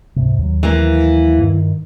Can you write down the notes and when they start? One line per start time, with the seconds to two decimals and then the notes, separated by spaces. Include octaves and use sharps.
0.16 C#2 G#2 C3
0.39 D#2 F#3
0.63 E3 A#3
1.39 G2 D#3